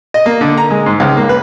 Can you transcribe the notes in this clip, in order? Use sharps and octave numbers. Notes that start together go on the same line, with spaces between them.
D#5
A#3
D3
A#5
G#3
G#2
C#2
A#3
B4